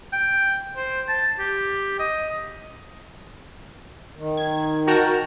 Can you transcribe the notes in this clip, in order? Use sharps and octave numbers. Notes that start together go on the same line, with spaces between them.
G5
C5
A5
G4
D#5
D#3
G#6
F#4 A#4 G5 A5 A#5